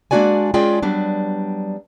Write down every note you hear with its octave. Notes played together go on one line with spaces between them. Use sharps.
G#3 A#3 D4 F#4 D5 G#5
G#3 C#4 F4 G#4 D5 G5
F#3 G3 B3 D4